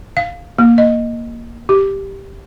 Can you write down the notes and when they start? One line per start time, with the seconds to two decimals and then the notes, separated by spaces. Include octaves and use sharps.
0.17 F5
0.59 A#3
0.78 D#5
1.69 G4